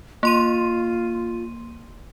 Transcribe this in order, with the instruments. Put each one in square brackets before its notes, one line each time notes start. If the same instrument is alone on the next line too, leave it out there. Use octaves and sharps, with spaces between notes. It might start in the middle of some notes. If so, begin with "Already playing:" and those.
[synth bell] A#3 C6 D#7 [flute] F4